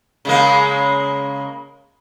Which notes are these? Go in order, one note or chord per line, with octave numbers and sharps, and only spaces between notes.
C#3 G#3 A#3